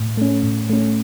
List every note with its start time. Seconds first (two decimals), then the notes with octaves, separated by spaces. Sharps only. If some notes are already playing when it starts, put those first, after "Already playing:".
Already playing: A2
0.17 A3 C#4
0.43 A2
0.70 A3 C#4